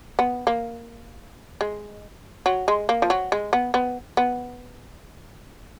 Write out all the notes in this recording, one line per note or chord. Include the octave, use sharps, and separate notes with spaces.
B3
A#3
G#3
F#3
G#3
A#3
F3
F#3
G#3
B3
B3
B3